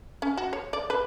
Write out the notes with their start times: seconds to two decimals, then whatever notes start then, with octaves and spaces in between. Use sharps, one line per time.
0.22 C#4
0.37 F#4
0.53 C#5
0.73 D5
0.90 B4